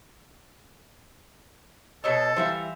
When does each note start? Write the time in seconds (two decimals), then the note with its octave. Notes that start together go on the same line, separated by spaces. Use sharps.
2.04 B2 A4 C#5 D#5 E6
2.37 E3 G3 C5 E5 F5 E6